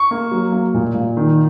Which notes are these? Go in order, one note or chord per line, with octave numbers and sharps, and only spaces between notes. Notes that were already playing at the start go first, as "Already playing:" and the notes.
Already playing: C#6
A#3
F#3
A#3
A#2
A#2
D#3